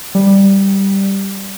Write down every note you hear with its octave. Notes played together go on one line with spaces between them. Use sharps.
G3